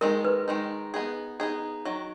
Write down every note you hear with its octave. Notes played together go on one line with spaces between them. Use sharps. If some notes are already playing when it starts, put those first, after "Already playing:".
D#3 G#3 D#4 A#4
B4
D#3 G#3 D#4
B3 D#4 G#4
B3 D#4 G#4
D#3 F#3